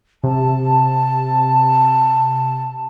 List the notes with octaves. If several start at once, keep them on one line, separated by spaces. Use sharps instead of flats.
C3 A5